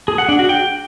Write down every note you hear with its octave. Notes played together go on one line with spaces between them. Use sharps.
G#4
F#5
D4
F#4
G5